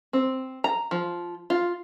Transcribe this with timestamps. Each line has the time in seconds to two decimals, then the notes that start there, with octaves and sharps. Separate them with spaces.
0.13 C4
0.64 A#5
0.91 F3
1.50 F4